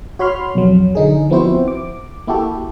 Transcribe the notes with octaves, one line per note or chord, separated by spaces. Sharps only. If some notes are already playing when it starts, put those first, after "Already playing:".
F#4 C#5 B5 C6 F6
B1 F2 F#3
D3 D#4 G#4
F3 B3 C4 E4 F#4 C5
D6
A#3 E4 F#4 G4 A4